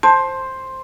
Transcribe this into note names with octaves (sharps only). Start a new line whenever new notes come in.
C5 A5